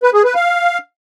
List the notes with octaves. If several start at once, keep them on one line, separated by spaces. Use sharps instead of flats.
B4
G#4
B4
F5